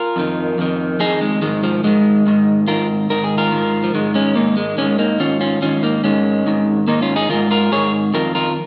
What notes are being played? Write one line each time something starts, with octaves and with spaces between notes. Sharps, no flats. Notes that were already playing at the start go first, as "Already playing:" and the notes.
Already playing: F4 A#4
F2 D#3
F2 D#3
F2 D#3 D#4 G#4
G#3
G#2 D#3 G#3
F3
G#2 D#3 G#3
G#2 D#3
G#2 D#3 F4 A#4
G#2 D#3 A#4
G#4
F4 A#4
G#2 D#3
F3
G#2 D#3 G#3
G#3 C#4
G#2 D#3 A#3 D#4
G#3
G#2 D#3 G#3 C#4
A#3 D#4
G#2 D#3 C#4 F4
C#4 F4
G#2 D#3 C#4 F4
A#3 D#4
G#2 D#3 G#3 C#4
G#2 D#3
G#2 D#3 A#3 D#4
C#4 F4
D#4 G#4
G#2 D#3 F4 A#4
F4 A#4
G#2 D#3 G#4 C#5
F2 D#3 F4 A#4
F4 A#4